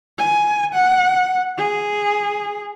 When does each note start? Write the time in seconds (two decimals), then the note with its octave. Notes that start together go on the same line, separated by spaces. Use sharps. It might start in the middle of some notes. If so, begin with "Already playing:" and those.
0.18 G#5
0.73 F#5
1.58 G#4